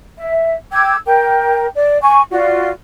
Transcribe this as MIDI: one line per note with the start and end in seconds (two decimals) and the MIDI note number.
0.18 0.55 76
0.72 0.95 79
0.72 0.95 86
0.72 0.95 88
0.72 0.95 92
1.06 1.67 70
1.06 1.67 79
1.75 1.98 74
2.02 2.22 80
2.02 2.22 85
2.31 2.69 65
2.31 2.69 66
2.31 2.69 74